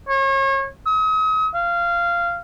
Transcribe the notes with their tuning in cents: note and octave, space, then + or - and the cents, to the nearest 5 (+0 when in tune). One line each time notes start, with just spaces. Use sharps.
C#5 -35
D#6 +40
F5 -15